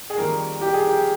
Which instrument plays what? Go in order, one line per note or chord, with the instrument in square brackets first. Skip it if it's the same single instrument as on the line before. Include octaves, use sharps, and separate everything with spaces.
[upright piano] G#4
F2 D#3 G3 A#3 A#4
G4
G#4
G4